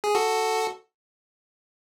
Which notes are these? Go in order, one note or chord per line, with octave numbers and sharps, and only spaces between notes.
G#4
F#4 A4